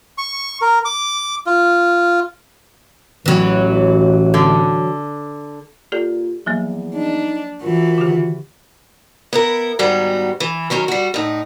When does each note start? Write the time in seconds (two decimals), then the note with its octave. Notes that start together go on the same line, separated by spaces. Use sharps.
0.18 C#6
0.62 A#4
0.85 D6
1.46 F4
3.26 A1 E3 F#3
4.34 D3
5.92 A#2 G4 A4 D5
6.46 E2 F3 F#3 A#3
6.94 D4 D#4
7.63 E3 F3 F#4 A#4
7.98 D3 D#3 G4
9.33 B3 E4 A#4
9.79 G#2 D#3 G3 B3 F#4
10.40 E3
10.70 D#3 F#3 C#4 A#4
10.88 G3 F#4
11.14 A2 D#4